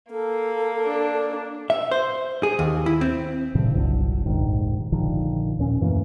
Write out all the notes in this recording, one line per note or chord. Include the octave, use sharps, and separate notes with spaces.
A#3 A4
D4
E5
C5
G#4
D#2
E4
C4
G2 A#2 C#3 E3
G1 C2 F#3 D4
F1 A#1 G#2 D#3
A#1 D3 D#3 F3
D#2 A#2 C#4
F#2 E3 A3 A#3